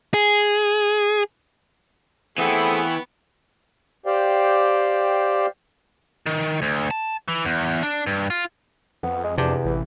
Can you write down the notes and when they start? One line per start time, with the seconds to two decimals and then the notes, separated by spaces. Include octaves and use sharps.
0.14 G#4
2.38 E3 A3 B3 C4 G#4 G5 B5 C#6
4.06 G4 C5 D5 F5 G5
6.26 D#3
6.62 D2
6.91 A5
7.28 E3
7.45 E2
7.83 D4
8.06 G2
8.30 F4
9.03 F2 B3
9.24 G#3
9.38 E2 C3 D4
9.65 A1 E3